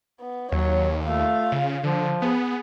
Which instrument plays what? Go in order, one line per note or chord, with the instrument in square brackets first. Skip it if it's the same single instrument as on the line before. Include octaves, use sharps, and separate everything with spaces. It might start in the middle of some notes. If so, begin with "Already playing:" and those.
[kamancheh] B3
[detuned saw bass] D#2 [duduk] F#3 [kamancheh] C#5
[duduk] A3 [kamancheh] F4 F5
[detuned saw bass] C#3
[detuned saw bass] D3 [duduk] F3
[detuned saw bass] B3 [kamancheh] G#4